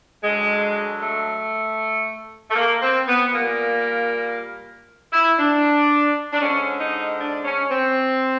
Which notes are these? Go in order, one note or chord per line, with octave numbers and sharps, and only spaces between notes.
D3 F#3 G#3
A3
A3
A#3
C4
B3
A#2 G3 A#3
E4
D4
D4
D3 F3 G#3 C#4
D#4
D4
C#4
C4